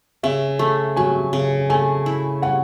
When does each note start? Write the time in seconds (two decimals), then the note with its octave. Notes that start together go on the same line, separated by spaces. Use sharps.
0.23 C#3 E5
0.59 A3
0.96 F#3 G#5
1.33 C#3
1.70 A3 G#5
2.06 E4
2.42 C#4 F#5